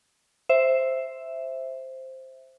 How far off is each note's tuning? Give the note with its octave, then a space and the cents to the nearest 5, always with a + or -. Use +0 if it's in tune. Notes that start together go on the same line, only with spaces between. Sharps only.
C5 +0 E5 +0